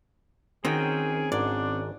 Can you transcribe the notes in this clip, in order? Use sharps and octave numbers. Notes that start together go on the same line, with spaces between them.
D#3 C4 C#4 F#4 G#4 G5
G#1 G#2 D4 D5